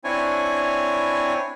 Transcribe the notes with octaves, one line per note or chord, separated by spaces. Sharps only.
C4 D4 E4 C#5 G#5